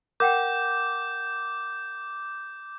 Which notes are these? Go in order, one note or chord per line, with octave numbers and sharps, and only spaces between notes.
A#4 F#5 G5 D6 G6